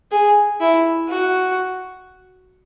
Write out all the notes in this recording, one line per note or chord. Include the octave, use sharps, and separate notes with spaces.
G#4
E4
F#4